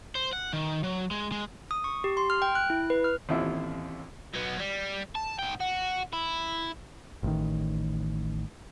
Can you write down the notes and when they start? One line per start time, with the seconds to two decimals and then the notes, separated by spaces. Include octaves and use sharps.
0.15 C5
0.33 F#5
0.53 D#3
0.84 F#3
1.11 G#3
1.32 G#3
1.71 D#6
1.84 C#6
2.04 G4
2.17 C6
2.30 F6
2.42 G5
2.55 F#6
2.70 E4
2.90 B4
3.04 F6
3.29 A1 D#2 C3 E4 F4
4.34 F#3 B3
4.59 G3
5.15 A5
5.39 G#2 G5
5.60 F#4
6.13 E4
7.23 A1 A2 D#3